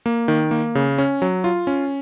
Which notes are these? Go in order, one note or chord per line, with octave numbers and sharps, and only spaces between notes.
A#3
D#3
A#3
C#3
C#4
F#3
F4
C#4